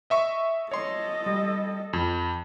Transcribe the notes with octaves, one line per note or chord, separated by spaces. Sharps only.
D#5 E5 C#6
A4 C#5 D#5 C6
G3
F2